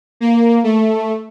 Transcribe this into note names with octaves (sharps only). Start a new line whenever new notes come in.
A#3
A3